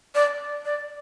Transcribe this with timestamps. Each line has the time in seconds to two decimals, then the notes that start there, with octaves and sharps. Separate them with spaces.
0.15 D5
0.65 D5